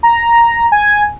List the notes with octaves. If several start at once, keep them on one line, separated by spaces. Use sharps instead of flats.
A#5
G#5